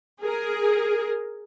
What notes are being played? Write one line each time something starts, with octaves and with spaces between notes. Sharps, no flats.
G#4 A#4